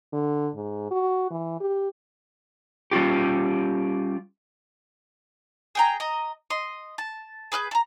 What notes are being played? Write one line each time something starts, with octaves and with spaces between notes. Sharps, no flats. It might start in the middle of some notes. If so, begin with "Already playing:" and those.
D3
G#2
F#4
E3
G4
G3 C#4 F4 G4
G#4 G5 A#5
D#5 A#5
D#5 C6
A5
G#4 B4 F6 G6
A4 A#5